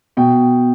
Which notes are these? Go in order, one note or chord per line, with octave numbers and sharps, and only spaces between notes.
B2 G5